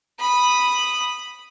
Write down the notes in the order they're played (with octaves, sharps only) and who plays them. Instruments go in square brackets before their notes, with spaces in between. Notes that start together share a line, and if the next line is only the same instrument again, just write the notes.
[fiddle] B5 D#6